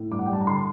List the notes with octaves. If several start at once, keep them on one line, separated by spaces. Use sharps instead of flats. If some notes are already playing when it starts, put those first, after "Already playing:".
Already playing: A2
G2 D6
F#5
G5
G3 A5
A#5
D3 C6